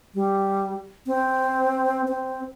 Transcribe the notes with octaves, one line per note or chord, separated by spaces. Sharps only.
G3
C4
C4